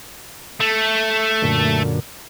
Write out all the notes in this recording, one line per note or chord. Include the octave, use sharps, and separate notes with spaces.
A3
F#2 A#2 D3